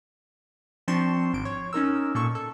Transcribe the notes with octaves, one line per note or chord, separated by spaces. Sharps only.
F3 C4 D4 C6 C#6 E7
G#1 D7
C#5
C#4 D#4 A#4 E6
A#2 A4 C#6
A4